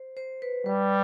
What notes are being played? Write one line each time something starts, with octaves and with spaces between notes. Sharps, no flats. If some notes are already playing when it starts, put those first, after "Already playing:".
Already playing: C5
C5
B4
G3 B4